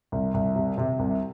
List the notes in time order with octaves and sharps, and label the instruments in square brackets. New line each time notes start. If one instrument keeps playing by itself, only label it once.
[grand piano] C2
C2
C3
C3
C2